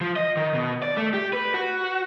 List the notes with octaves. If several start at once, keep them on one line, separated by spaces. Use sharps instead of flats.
F3
D#5
D#3
B2
D5
A3
G4
B4
F#4